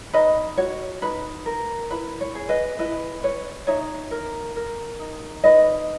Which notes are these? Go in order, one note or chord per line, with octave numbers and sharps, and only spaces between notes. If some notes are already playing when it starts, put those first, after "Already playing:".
D#4 B4 D#5
F#4 C#5
D#4 B4
A#4
E4 B4
C#5
G#4
B4 D#5
E4 B4 D#5
B4 C#5
D#4 C#5 E5
A#4
A#4
D#4
D#4 B4 D#5